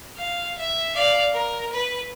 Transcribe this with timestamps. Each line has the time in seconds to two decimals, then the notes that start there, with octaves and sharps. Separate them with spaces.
0.16 F5
0.58 E5
0.95 D5 F5
1.33 A#4
1.72 B4